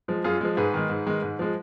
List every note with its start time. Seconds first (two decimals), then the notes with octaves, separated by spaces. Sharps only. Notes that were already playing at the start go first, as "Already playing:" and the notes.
0.08 F3 G#3
0.24 F#2 F4 G#4
0.41 F3 G#3
0.57 G#2 G#4 B4
0.74 D#3 G#3
0.90 G#2
1.06 D#3 G#3
1.23 G#2
1.39 F3 G#3